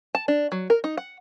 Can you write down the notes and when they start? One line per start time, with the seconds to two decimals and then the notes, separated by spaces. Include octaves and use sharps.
0.15 A5
0.28 D4
0.52 F#3
0.70 A#4
0.84 D#4
0.97 F#5